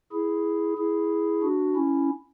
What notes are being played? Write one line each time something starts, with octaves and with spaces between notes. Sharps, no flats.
E4 G#4
E4 G#4
D4 F#4
C#4 E4